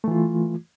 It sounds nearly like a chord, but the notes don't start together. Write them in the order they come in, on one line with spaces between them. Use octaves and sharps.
A3 E3 F4